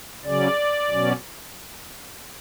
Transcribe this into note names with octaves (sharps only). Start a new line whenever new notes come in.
C#3 F#3 C#4 D5
B2 F#3 C#4